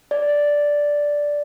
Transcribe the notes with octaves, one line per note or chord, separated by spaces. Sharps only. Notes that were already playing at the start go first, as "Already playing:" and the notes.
D5